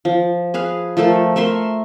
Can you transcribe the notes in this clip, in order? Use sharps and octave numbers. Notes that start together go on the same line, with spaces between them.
F3
G#4 B4 F5
F3 A3 A4 A#4
A3 A#4 E5 C6